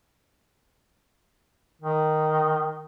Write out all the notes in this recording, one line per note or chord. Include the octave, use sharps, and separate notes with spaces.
D#3